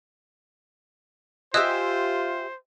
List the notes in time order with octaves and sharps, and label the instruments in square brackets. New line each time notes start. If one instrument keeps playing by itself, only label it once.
[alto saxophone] F4 [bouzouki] G4 E5 G#5 [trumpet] C5 [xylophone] D#5 D#6 F#6